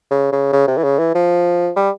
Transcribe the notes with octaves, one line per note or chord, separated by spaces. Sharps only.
C#3
C#3
C#3
C3
E3
C#3
E3
F3
G3